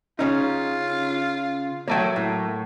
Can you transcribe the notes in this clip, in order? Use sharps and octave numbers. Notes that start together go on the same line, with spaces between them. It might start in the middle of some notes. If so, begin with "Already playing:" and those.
C#3 C#4 D#4 F4
F#3 A3 A#3 C#5 G5
A2